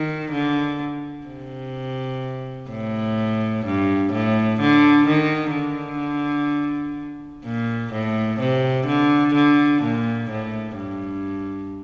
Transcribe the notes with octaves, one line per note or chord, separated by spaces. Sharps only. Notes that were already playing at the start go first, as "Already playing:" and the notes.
Already playing: D#3
D3
C3
A2
G2
A2
D3
D#3
D3
A#2
A2
C3
D3
D3
A#2
A2
G2